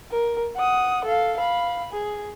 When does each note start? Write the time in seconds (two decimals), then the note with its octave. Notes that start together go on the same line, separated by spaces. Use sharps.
0.11 A#4
0.56 F#5 D#6
1.05 A4 F5
1.37 F5 B5
1.93 G#4